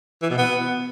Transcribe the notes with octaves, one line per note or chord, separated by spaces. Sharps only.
E3
B2
B3